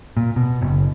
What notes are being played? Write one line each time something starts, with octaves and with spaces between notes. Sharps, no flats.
A#2
B2
F#1